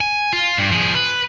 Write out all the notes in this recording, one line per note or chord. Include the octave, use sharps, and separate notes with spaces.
G#5
F4
G2
F3 G#4
B4